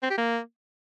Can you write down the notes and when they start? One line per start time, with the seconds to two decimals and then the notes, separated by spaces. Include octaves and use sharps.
0.03 C4
0.10 G4
0.18 A#3